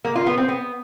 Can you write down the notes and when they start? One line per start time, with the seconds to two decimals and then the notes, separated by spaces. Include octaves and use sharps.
0.05 A#3
0.15 F4
0.26 B3
0.37 C4
0.48 B3